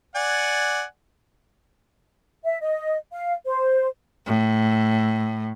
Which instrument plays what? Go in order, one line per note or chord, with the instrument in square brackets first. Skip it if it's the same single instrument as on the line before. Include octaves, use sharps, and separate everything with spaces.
[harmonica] D5 F#5 G#5
[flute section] E5
D#5
F5
C5
[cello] A2